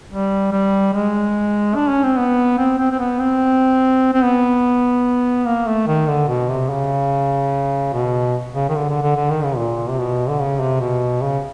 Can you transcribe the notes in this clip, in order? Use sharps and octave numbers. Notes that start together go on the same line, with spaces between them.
G3
G3
G#3
D4
C#4
C4
B3
C4
C4
C4
B3
C4
C4
B3
A#3
A3
D#3
D3
B2
C3
C#3
B2
C#3
D#3
D3
D3
D3
D3
D#3
C#3
A#2
C3
B2
D3
C#3
C3
B2
C#3